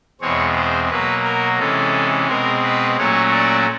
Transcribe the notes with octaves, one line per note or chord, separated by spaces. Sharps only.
E2 B2 G#3 C4 C#5
C5
B2 F#3 A#3 B4
A#4
C3 E3 G#3 C#4 A4
B2 G#3 C4 A#4
B4
A#2 F#3 A3 C#4 C#5
D5